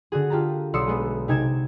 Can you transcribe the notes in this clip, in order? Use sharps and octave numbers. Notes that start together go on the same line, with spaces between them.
D3 F#4 G#4
F4 G4 A5 A#5
B1 D5 C6 D#6 E6 C#7
G#3 B3
C3 D#4 G#5 G#6 D7 E7